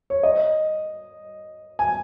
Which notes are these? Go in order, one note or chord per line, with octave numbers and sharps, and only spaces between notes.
C#5
D#5
G#5